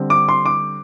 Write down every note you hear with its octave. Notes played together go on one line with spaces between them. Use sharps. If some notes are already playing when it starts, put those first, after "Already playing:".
Already playing: D3 G3 C4
D6
C6
D6